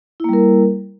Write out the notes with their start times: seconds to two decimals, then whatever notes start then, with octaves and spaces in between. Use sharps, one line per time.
0.20 E4
0.24 A#3
0.29 G3
0.33 A#4